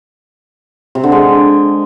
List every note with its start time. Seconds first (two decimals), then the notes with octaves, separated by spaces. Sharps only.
0.95 C3
1.04 D3
1.12 G#3